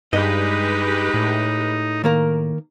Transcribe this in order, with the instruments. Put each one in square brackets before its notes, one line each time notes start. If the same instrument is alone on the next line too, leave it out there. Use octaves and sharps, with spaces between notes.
[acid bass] G2 [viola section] G#3 G4 B4 [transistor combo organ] D#4 [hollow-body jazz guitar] D#5
[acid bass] A2
[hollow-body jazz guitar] D#3 A#3 A#4